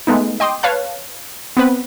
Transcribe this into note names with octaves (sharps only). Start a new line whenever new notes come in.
G#3 A3 B3 D#4
D#5 G5 C6 D6 D#6
B4 C#5 F5 A5 F#6
B3 C4 B4